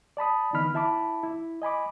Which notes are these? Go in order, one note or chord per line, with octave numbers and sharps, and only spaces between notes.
D5 A5 B5 D#6
D3 E3 B3 D#4 B5 F6
E4 E5 A5 B5 D6
E4
D#5 G#5 B5 D6